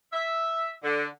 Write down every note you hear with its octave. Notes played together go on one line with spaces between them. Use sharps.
E5
D3